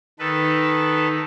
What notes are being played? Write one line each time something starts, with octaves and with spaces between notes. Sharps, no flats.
D#3 A4 B4